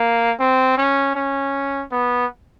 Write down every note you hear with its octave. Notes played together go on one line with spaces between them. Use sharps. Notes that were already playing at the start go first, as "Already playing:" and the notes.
Already playing: A#3
C4
C#4
C#4
B3